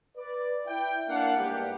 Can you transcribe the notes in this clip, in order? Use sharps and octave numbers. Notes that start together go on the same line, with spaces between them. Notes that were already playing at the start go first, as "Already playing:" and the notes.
B4 D5
E4 G5
A#3 D4 F5 F#5
G#2 E3 G3 A#3 B3 G4